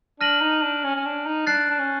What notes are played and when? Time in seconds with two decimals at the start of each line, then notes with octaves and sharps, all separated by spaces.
0.20 D4 F6 A#6 D#7 F#7
0.41 D#4
0.62 D4
0.84 C#4
0.96 C#4
1.05 D4
1.26 D#4
1.47 D4 F#6 A6 C7
1.70 D4
1.79 C#4